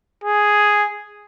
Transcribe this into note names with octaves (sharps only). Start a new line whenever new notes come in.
G#4